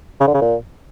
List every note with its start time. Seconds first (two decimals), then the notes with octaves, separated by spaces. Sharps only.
0.20 C#3
0.27 D3
0.34 C#3
0.41 A#2